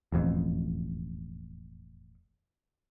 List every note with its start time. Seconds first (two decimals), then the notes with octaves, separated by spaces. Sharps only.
0.12 E1 A1 F2